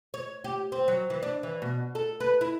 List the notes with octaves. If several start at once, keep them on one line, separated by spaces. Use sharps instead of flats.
C#5
G4
C4
F#3
E3
D4
E3
B2
A4
B4
E4